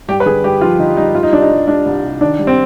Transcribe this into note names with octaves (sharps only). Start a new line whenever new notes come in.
G2 G4
B4
D3 G#4
G2 G4
F3 F4
D3 D#4
G2 D#4
G3 F4
D#4
C2 D4
D#4
G3
G3 D4
C2
C3
D#3 D4
G3
C4